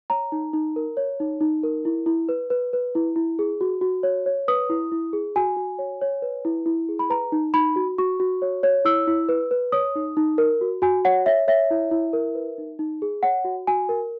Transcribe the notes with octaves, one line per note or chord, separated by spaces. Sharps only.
C#5 A#5
D#4
D#4
A#4
C#5
D#4
D#4
A#4
E4
E4
B4
B4
B4
E4
E4
G#4
F#4
F#4
C#5
C#5
B4 D#6
E4
E4
G#4
F#4 G#5
F#4
C#5
C#5
B4
E4
E4
G#4
B5
B4 A#5
D#4
D#4 B5
F#4
F#4 C#6
F#4
C#5
C#5
E4 E6
E4
B4
B4
C#5 D#6
D#4
D#4
A#4
F#4
F#4 G#5
C#5 F#5
C#5 E5
C#5 E5
E4
E4
A#4
B4
D#4
D#4
G#4
C#5 F#5
F#4
F#4 G#5
A#4